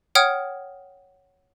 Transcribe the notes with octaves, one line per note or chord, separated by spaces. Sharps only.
C#5 F#5 G5 D#6 F6 G#6